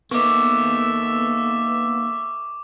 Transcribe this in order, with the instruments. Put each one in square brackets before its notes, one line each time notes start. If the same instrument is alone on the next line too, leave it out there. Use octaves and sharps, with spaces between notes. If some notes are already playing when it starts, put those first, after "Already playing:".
[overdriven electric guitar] A#3 D#4 [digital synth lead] B3 [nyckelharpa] A4 E5 [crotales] C#6 D6